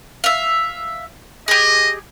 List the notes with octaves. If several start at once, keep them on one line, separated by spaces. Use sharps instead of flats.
E5 F5
G4 G#4 D#5